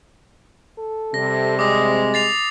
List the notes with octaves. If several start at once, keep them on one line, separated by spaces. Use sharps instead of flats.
A4
C3 G3 A#6
G#3 D6 D#6 A#6
A6 C7 F7